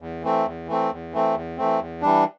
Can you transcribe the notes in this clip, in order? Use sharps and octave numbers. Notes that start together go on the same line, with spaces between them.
E2
E3 A3 C4
E2
E3 A3 C4
E2
E3 A3 C4
E2
E3 A3 C4
E2
E3 G3 D4